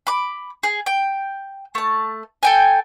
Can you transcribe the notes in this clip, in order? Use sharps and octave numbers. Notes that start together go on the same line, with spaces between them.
B5 D6
G#4
G5
A3 A5
A4 G5 G#5